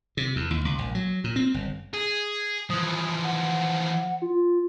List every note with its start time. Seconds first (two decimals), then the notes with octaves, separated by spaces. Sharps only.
0.17 C3
0.36 E2
0.51 D#2
0.65 C#2
0.79 A#1
0.95 F#3
1.24 A#2
1.36 C4
1.54 G1
1.94 G#4
2.70 E3 F3 D#6
3.24 F#5
4.22 F4